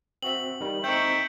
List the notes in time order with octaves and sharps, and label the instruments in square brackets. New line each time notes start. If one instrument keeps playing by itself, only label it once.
[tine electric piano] C4 F#4 E5 [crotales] F#7
[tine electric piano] D#3 G3
[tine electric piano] C4 D#4 [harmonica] E5 G5 C#6 [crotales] G6 F#7